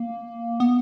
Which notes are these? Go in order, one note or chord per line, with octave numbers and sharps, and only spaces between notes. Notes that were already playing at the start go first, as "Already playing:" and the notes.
Already playing: A#3
B3